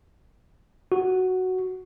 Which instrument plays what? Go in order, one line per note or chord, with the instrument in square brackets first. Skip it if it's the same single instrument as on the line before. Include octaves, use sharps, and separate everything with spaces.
[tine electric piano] F#4